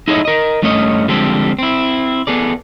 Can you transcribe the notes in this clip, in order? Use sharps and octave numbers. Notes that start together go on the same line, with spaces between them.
D#4 E4 G#4 A4 C#5 D#5
A#4 D#5
G2 A3 C#4 C#5 D#5
D3 F3 G3 G#3 C4 A4
C4 E4
B3 G#4 A4 D5